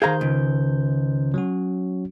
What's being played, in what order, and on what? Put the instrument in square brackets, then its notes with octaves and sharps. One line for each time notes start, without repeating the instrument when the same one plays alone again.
[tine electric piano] D#3 C5 G6 [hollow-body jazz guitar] G#4 F5 A#5
[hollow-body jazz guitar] C#2
[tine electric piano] F#3 C#4 F#4